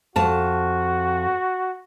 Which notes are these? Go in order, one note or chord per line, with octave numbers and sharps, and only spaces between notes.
F2 F#4 A5